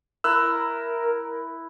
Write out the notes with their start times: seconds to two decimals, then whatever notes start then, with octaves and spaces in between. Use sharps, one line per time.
0.24 E4 A#4 E6 F#6